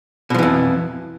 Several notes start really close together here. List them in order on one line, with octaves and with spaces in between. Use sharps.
B2 F3 E3 F2